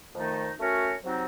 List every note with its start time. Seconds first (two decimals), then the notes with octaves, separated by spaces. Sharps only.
0.15 F2 D#3 A3 D#4
0.58 A3 C#4 F#4 A#4 C#5
1.02 C3 F#3 C4 D#4 F#4